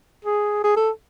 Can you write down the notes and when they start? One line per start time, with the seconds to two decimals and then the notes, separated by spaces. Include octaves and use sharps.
0.25 G#4
0.64 G#4
0.77 A4